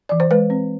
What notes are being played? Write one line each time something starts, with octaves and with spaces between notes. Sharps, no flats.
E3 D5
C5
G#3 B4
C4